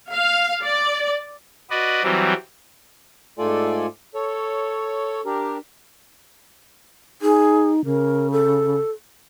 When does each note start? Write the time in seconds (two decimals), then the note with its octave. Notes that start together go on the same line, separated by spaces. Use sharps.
0.13 F5
0.64 D5
1.70 F#4 B4 D5 D#5
2.03 E3 F#3 G3 C4
3.39 G#2 A3 F4 A4 D5 G#5
4.15 A4 C#5
5.26 D4 G4 A#4
7.22 D#4 G#4
7.85 C#3 A#4
8.32 A4